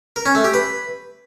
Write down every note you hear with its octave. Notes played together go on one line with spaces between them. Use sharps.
A#4
C#4
A3
G4
B4